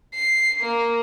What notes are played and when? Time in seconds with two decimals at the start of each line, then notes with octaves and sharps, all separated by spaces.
0.14 C7
0.60 A#3